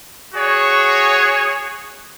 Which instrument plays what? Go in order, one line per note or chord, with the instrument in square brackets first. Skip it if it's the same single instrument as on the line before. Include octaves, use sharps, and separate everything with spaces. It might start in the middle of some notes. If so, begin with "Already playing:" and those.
[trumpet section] F#4 G#4 C#5